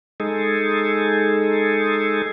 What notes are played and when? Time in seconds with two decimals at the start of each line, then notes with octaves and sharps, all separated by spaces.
0.20 G#3 D#4 G#4 A4